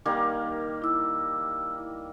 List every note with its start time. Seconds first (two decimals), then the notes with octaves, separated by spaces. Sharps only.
0.05 D#3 G3 A#3
0.82 E4 E6